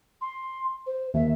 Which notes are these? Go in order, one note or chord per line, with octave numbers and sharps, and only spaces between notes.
C6
C5
D#2 E5